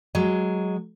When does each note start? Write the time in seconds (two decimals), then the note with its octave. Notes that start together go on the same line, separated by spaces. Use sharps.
0.15 F#3 G#3